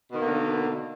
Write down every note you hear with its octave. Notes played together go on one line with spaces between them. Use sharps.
B2 D3 D#3 A#3